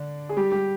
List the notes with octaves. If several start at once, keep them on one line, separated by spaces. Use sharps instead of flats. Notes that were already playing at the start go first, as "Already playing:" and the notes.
Already playing: D3 D4
G#4
G3 G4
G3 G4